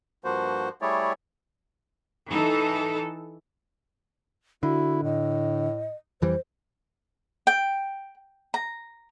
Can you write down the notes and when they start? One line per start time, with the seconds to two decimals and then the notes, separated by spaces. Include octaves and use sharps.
0.24 G2 F3 A#3 F#4 C5
0.82 G3 A3 E4 G#4 C#5 D5
2.31 E3 D#4 A4
4.63 D3 E4 F#4
5.03 A2 D#5
6.22 F2 E3 G3 C5
7.47 G5
8.54 A#5